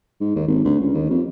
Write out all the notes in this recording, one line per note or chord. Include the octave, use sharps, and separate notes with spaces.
G#2
D#2
G#1
D2
C#2
D#2
F2